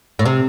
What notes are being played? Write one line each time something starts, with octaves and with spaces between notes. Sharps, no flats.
A2
C3